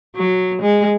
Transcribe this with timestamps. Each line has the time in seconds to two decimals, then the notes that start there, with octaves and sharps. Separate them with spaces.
0.16 F#3
0.62 G#3